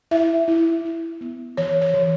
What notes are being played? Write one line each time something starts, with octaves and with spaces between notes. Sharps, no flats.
E4 E5
E4
E4
B3
E3 C#5
C#5
E3